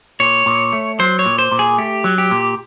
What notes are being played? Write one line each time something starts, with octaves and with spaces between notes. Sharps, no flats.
A#2 C#5
A#2
A3
F#3 C5
C#5
A#2
C5
A#2
G#4
A3 G4
F#3
G4
A#2